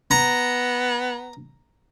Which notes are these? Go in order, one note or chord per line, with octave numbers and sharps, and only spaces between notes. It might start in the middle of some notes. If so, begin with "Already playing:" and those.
B3 A#5